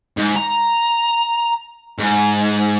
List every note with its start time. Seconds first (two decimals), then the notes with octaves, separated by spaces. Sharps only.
0.17 G#2
0.36 A#5
1.99 G#2